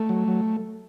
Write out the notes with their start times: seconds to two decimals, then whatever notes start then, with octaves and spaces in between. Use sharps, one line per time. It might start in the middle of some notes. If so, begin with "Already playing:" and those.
Already playing: A3
0.09 F#3
0.28 F#3